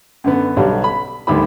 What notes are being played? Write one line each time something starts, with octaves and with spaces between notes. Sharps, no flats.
F#2 D3 B3
B1 D3 F#3 G3
B5
G#1 D2 D#3 G3 G4 B5